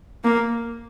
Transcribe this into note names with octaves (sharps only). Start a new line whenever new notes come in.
A#3